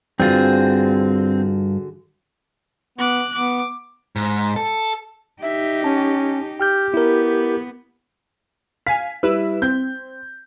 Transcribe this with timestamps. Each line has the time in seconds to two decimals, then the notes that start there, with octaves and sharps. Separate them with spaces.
0.20 G2 D3 C4 F4 F#4 G#4
2.98 B3 D6 F#6
3.34 B3 D6
4.16 G#2
4.56 A4
5.42 D#4 G4 E5
5.84 C#4 A5
6.60 G4 G5 F6 G6
6.94 B3 E4 A#4
8.87 F5 G#5 B6
9.23 G3 E4 B4 E5 E6
9.62 C4 G6